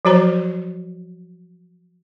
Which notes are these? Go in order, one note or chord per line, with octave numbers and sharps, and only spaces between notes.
F3 F#3 F#4 C5 A#5